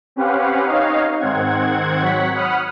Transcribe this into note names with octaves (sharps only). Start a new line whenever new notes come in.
C4 C#4 G4 B4 F5 F#5
D#4 C#5 D#5 F5
G#2 D#3 C4 F#5 G#6
F#3 C#5 F#5 B6
F#5 B5 D#6 F6